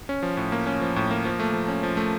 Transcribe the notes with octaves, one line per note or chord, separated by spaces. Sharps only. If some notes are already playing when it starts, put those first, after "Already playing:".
C#4
F3
A2
A#3
C#4
F3
A2
A#3
F3
A3
F3
C#4
F3
A3